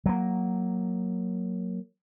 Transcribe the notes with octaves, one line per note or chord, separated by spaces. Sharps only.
F#3 A#3